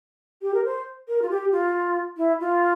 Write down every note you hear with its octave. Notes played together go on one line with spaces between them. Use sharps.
G4
A#4
C5
A#4
F4
G4
F4
E4
F4